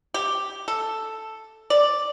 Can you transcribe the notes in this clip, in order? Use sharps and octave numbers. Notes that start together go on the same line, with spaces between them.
G4
A4
D5